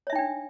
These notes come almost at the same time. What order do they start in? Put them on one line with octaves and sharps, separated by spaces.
C#5 E5 D#4 G5 D4